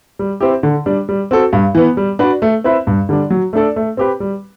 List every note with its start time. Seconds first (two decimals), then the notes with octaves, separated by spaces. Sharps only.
0.19 G3
0.40 C4 E4 G4
0.63 D3
0.86 G3 D4
1.09 G3
1.31 C4 F#4 A4
1.53 G2
1.75 E3 B3
1.97 G3
2.19 D4 F#4 B4 D5
2.42 A3
2.64 C4 E4 B4 E5
2.87 G2
3.09 D3 G3 D4
3.30 F#3
3.53 A3 D4 A4 D5
3.76 A3
3.97 C4 G4 B4
4.20 G3